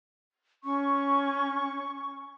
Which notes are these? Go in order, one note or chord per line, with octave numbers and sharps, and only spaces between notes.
C#4 C#6